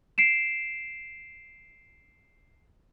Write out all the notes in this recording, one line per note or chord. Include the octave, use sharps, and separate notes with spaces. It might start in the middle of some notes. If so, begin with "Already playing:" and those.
C7 D7 E7